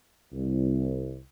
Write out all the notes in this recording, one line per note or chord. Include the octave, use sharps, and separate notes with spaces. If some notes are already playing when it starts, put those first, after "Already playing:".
C2